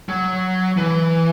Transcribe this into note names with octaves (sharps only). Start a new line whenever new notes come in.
F#3
E3